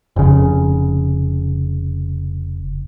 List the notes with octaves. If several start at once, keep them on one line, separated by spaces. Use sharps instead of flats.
F1 C#3